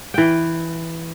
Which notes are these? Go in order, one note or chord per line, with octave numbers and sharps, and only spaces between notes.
E3 G5